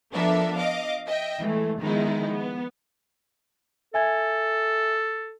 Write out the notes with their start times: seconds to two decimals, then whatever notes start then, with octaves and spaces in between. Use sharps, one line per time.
0.13 F3 B3 D4 A4 A#4 E5
0.57 D#5 F5 D6
1.06 D#5 E5 G5
1.40 E3 G#3 A3
1.80 D#3 F3 G#3 B3 D#4 E4
2.31 B3
3.94 A4 E5 G#5 G#6